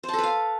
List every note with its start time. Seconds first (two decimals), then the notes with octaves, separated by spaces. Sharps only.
0.03 C5
0.08 A5
0.13 A4
0.18 B4
0.23 F5